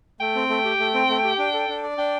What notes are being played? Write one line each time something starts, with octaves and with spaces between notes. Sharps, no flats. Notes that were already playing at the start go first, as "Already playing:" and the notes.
A3 G5
C4
A3
G4
A3
C4
A3
G4
D4
A4
D4
D5
D4 G5